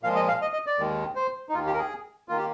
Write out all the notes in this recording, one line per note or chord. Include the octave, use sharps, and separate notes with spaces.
A#2 F3 G#3 F5
D#5
F5
D#5
D#5
D5
D#2 D#3 G#3
C5
D#4
D#2 D#3 A#3 F4
G4
A#4
G#4
D#3 A#3 F4
G4